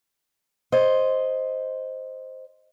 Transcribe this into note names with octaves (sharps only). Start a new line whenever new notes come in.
C5 D#5